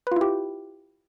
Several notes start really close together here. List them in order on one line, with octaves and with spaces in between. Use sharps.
B4 F4 E4 G4